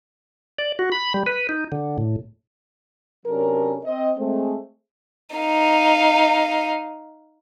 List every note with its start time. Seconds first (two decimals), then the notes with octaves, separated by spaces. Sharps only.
0.58 D5
0.79 F#4
0.92 B5
1.14 G3
1.26 B4
1.49 D#4
1.72 D3
1.98 A2
3.26 C3 F#3 C#4 D4 A4 A#4
3.85 C4 D#5
4.18 G#3 A3 C4
5.36 D#4 F5